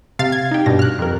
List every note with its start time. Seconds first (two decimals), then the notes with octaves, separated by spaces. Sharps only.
0.19 C3 F5 A6
0.32 G#6
0.51 D#4 G4
0.66 G2 B2 A#6
0.79 F6 F#6
0.99 F2 A#4